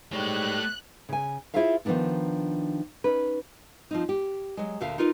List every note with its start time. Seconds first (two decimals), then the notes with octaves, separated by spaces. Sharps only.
0.12 G#2 G3 A3 C#5 F#6
1.09 C#3 G#5
1.54 E4 F4 G#4 C5 E5 F5
1.85 D#3 F3 G#3 B3 D4 D#4
3.04 C#4 D#4 B4
3.91 F3 C4 D#4
4.09 G4
4.57 F#3 G#3
4.80 D2 A#2 D3 A#4 E5 F5
4.98 D#4 F4 A#4 B4